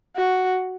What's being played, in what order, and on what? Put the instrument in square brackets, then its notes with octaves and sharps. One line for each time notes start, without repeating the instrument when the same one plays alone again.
[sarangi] F#4